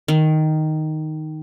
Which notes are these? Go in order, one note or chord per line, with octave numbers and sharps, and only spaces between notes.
D#3